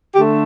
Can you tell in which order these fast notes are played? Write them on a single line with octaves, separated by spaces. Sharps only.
D3 G4 A3